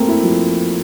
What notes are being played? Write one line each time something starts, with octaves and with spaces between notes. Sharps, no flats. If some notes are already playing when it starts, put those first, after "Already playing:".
Already playing: A3 A#3 C4
E4
F3